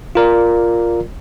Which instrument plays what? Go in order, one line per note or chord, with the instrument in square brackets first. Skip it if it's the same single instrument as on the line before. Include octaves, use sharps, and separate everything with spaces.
[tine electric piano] F4 A#4 D5